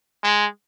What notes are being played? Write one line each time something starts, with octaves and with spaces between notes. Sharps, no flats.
G#3